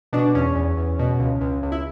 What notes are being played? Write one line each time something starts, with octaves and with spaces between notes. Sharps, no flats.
B2 D4
E2 C#4
E2
E2
B2
C#2
C#2
C#2
E4